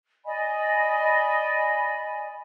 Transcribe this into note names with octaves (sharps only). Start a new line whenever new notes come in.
D5 D#5 G#5 B5